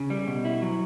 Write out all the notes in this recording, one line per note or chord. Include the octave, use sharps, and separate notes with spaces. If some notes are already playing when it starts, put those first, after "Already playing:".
Already playing: C#3
G3
B2
E4
F#3